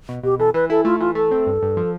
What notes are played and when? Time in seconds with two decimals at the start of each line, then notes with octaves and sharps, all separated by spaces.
0.09 B2
0.23 B2 G4
0.39 E3 A4
0.54 E3 B4
0.70 E4 A4
0.85 A3 F4
1.00 E3 F4
1.15 A3 A4
1.31 C4
1.47 G2
1.62 G2
1.77 F3